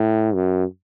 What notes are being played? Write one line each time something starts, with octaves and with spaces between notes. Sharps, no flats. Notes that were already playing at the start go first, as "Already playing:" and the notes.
Already playing: A2
F#2